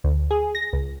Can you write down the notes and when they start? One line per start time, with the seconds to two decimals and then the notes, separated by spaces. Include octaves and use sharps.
0.04 D2
0.31 G#4
0.55 A#6
0.73 C#2